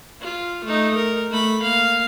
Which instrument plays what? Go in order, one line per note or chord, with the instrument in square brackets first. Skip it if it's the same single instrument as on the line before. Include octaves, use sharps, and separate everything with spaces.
[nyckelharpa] F4
A3 D#4
A#4
A3 B5
A#3 F5